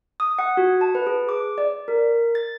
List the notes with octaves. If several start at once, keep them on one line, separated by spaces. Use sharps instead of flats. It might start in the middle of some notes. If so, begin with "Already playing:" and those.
D#6
F#5
F#4
A5
B4
G#4
D6
D5
A#4
A6